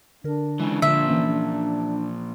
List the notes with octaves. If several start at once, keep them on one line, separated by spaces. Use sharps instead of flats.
D3 D4 A#4
C#3 E3 G#3 G#5
A#2 D3 F3 E5
E3 A#3 C#4